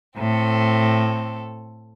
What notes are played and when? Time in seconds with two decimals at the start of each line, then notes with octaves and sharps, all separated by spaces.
0.17 A2 C4 A4